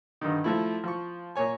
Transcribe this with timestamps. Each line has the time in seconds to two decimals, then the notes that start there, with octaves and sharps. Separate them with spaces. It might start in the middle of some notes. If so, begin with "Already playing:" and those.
0.21 G2 D3 D#3
0.44 F3 A3 E4
0.84 F3 C#6
1.36 A#2 A#3 C#5 G#5